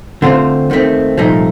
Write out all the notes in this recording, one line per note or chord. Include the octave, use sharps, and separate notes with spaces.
D3 A3 C4 F4 C5
D#2 D#3 A3 C4
C2 A#2 F3 A3 D#4